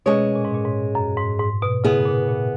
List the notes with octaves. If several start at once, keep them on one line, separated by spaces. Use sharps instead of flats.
B2 G#3 C#4 G#4 C#5
A#2
G#2
A#2
G#2
F#2
G#2
G#2
B2
C#3 B3 E4 G#4
A#2
A#2